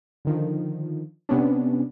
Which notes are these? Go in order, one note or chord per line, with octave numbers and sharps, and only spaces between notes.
D3 D#3 F3
C3 B3 C#4 D4